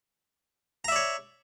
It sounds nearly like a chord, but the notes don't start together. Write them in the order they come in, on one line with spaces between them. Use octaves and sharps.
A#5 E5 D5 C#5